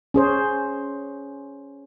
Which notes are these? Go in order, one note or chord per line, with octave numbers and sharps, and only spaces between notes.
C#4 G#4 C5